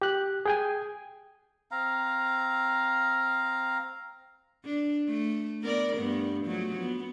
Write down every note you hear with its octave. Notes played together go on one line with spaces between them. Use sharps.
G4 F#6
G#4 G5 G#5
C4 F5 A#5
D4
A3
B3 A#4 D5
G2 A3 B3
F3 F#3 A3
B3